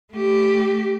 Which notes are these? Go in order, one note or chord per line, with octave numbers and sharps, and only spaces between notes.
A3 G4